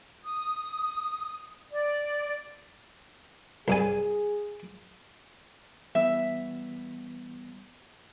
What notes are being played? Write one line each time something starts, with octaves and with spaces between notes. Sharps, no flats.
D#6
D5
C2 G2 G#4 G#5
E3 G3 B3 E5